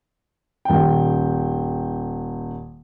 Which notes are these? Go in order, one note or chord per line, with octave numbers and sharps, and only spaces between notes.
D#1 G5